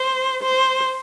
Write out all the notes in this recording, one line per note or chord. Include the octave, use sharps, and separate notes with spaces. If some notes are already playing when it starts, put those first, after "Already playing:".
Already playing: C5
C5